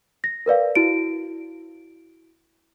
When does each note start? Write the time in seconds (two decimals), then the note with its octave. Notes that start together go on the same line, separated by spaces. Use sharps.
0.24 A#6
0.46 A#4 B4 D5 F5
0.75 E4 F#4 D7